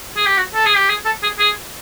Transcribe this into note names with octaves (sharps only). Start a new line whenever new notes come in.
G#4
G4
F#4
A4
G#4
G4
G#4
A4
G#4
G#4